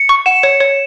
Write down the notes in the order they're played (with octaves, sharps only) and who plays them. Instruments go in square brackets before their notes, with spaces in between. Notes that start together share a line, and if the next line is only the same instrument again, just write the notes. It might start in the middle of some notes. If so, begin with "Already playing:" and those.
Already playing: [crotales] C#7
[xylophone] C#6
[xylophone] F#5 [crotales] E7
[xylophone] C#5
C#5